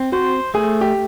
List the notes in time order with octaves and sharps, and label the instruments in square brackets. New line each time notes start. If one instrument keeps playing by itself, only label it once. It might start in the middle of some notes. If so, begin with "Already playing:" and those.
Already playing: [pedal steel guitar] C4
[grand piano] F#4 [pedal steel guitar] C5
[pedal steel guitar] A3 [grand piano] G#4
[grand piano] G4